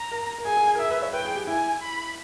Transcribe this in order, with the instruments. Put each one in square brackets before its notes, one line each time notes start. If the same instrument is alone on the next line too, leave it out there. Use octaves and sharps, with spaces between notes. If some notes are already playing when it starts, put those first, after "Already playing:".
Already playing: [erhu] A#5
[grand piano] A#4
A#4
[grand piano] G#4 [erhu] G#5
[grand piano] G#4
G#4
A#4
[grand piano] G#4 [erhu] E5
[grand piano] B4
C#5
[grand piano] B4 [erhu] G5
[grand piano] G#4
G4
[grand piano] E4 [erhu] G#5
[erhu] B5